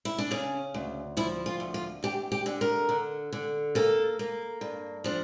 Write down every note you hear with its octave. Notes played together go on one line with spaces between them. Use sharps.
E4
D4
C#3 C#4
D2
F3 E4
F4
D2
F4
D2 G4
G4
D3
A#4
D3
D3
A#3 A4
A#3
G2
F3 D4